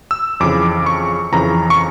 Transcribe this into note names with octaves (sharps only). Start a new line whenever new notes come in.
E6
F2 C#3 E3 D6
C#6
F2 C#3 E3 A#5
C#6